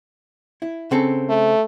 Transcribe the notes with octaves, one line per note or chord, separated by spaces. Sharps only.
E4
C#3 C4 A4
A3